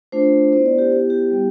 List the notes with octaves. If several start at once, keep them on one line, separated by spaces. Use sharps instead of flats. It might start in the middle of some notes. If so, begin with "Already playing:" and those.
A3 D4 F4 C5
B3 E4 C5
D5
G4
B3 E4 G4
G4
G3 B3 E4